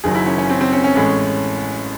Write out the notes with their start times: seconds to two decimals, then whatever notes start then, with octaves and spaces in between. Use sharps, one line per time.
0.04 F#1 F#2 D#3 F#3 G#4
0.15 E4
0.26 C#4
0.38 C#4
0.50 C4
0.61 C4
0.73 C#4
0.84 C#4
0.95 A1 A2 G#3